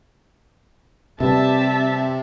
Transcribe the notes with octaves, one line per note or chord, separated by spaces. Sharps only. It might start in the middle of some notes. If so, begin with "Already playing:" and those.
C3 G3 C4 G4 B4 E5 A5